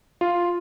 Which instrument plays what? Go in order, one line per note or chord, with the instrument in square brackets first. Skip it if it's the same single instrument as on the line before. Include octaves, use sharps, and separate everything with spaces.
[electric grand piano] F4